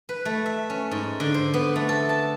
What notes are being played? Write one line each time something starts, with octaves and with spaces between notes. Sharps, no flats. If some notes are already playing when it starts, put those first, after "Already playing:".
B4
A3
E5
C#4
G#2
D3
C5
B3
A3
A4
A5